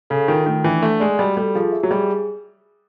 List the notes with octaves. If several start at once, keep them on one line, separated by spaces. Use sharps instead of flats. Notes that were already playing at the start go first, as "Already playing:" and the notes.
C#3 A4
D#3 F4
D#3 A3
E3 D4
A3 F#5
G#3 D5
G3 F#4
G3 A4
F3 G#4
E5
F#3
G3 G#4